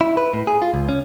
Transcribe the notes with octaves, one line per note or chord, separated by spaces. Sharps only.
E4
B4
A2
G#4
F4
C#2
C#4